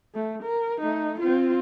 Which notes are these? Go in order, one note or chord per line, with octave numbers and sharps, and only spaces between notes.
A3
A#4
A3 D#4
C4 F4